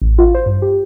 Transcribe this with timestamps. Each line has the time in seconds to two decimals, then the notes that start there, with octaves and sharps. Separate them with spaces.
0.02 A1
0.18 F4
0.34 C5
0.46 G2
0.62 G4